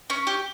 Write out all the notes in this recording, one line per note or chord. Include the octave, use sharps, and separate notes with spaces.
C#4
G4